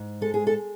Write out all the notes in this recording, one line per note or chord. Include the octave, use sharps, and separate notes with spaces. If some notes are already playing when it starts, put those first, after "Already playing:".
Already playing: G#2
G#3 A4
G#4
A4